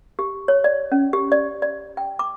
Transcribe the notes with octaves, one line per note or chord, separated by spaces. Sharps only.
G4
C#5
D5
C#4
G4
D5
D5
G5
D6